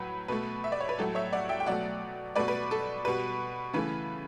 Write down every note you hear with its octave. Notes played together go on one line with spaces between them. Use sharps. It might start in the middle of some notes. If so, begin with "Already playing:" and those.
Already playing: A2 F#3 B4
B2 A3 B4
E5
D5
C#5
B4
A2 F#3 A3 A4
C#5 E5
D5 F#5
E5 G5
G5
B2 F#3 A3 D5 F#5
B2 A3 B4 D5
B4
A4
B2 G3 B4
C#3 E3 A3 B4